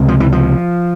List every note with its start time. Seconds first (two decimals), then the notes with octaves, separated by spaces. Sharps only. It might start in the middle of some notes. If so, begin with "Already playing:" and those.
Already playing: C#2 C3
0.08 F3
0.20 E3
0.32 F3